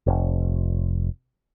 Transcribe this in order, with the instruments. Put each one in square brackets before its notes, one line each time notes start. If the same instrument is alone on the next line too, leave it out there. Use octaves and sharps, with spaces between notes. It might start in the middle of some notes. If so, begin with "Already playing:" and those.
[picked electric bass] F1